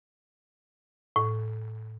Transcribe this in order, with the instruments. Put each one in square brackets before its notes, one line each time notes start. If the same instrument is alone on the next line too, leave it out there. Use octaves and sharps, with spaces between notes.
[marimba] A2